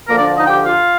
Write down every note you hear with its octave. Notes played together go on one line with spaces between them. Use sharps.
D2 D3 F3 A#3 A#4
D4 D5
D#4 D#5
G4 G5
F4 F5